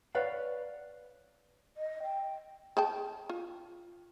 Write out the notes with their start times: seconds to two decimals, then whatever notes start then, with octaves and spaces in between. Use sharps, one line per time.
0.15 B4 C#5 D5 F5 F#5
1.76 D#5
2.03 G5
2.77 G#4 G5 A5
3.29 F4